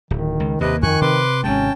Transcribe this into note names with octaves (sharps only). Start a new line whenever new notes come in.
D1 D#3
C#2
D#2 C3 A#3 B4 D#5
F2 D#3 G#5 C#6 F#6
C3 B4 C6 D6
G#1 C3 G#3 C#4 G5 A5